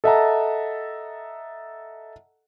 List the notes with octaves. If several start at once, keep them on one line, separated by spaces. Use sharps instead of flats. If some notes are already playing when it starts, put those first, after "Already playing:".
A4 D#5 E5 F#5 A5 A#5